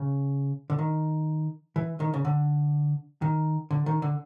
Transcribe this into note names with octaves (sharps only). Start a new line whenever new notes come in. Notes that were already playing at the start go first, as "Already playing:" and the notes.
Already playing: C#3
D3
D#3
E3
D#3
C#3
D3
D#3
D3
D#3
D3